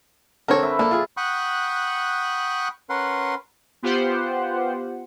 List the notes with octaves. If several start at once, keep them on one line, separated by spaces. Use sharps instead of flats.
D3 C4 A4 A#4 C#5
B4 E5
A#3 D4 A4
F4 G#4
F#5 G5 B5 C#6 D#6 F#6
C#4 A#4 B4 F#5 C6
B3 F4 G4 C5 F#5